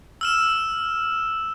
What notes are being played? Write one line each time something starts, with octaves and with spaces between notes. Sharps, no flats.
E6 F6 E7